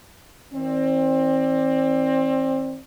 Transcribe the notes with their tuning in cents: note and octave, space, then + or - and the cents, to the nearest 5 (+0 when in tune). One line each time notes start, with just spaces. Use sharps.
E3 -45 C4 +25 D5 +0